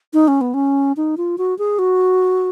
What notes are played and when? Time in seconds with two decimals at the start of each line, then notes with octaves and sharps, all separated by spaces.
0.13 D#4
0.28 C#4
0.41 B3
0.54 C#4
0.97 D#4
1.17 F4
1.38 F#4
1.59 G#4
1.79 F#4